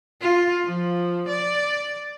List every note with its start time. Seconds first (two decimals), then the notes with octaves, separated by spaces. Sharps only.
0.21 F4
0.65 F3
1.28 D5